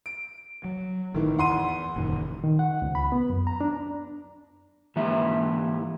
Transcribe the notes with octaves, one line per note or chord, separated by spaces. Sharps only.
D7
F#3
A1 D#3 E3
E2 F#5 C6 D#7
F#1 A#2 D#3
D#3
F#5
C#2
B5
B3
F#2
A#5
D4
G#2 E3 A#3 G4 E5